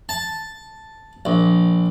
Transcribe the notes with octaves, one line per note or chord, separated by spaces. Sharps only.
A5
A#1